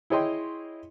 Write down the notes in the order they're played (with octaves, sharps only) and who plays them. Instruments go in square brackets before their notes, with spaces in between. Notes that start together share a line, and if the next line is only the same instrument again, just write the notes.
[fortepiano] E4 G#4 C#5 D#5 G5 C6